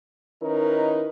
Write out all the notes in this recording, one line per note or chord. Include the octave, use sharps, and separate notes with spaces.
D#3 C#4 D#4 E4 A#4 B4